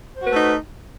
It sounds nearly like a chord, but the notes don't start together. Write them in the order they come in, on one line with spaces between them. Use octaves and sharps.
C5 F#4 B4 A3 D#4